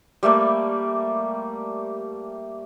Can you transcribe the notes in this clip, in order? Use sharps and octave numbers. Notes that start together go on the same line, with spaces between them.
G3 A3 A#3 D5